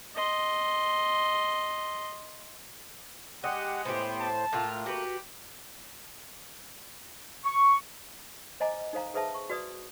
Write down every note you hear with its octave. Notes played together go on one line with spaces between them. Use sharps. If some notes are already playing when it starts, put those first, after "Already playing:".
D#5 C6
G#3 G4 D#5 F#5
A2 B3 G4 C5
A5
A2 A3 A#3 F4
F#4 G4 B4
C#6
C5 D#5 G#5 A#5 D6
D#4 A4 C5 F5 A#5
G#4 A4 B4 C5 E5 A5
C#6
F#4 B4 D5 D#6